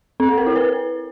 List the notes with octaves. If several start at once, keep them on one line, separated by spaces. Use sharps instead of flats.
C4
A4
A#4
E4
B4